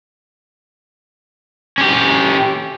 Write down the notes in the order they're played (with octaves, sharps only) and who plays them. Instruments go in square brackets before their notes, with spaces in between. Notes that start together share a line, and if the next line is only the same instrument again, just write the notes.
[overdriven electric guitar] C#4 G4